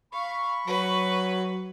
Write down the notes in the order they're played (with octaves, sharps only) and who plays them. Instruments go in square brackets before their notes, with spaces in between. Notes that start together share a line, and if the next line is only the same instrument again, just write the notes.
[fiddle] F5 [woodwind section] B5 C#6
[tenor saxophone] F#3 [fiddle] B4